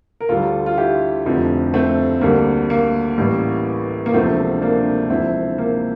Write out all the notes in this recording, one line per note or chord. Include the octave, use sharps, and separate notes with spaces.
A#4
D2 D3 G3 F4 A4
F4
E4 G4
F1 F2 D3 F3
A3 C4
D2 D3 G3 A#3
A#3
A1 A2 E3 G3
A#3
E1 D2 C3 F3 A3 C4
A#3 D4
E1 D2 C3 F3 C4 E4
A#3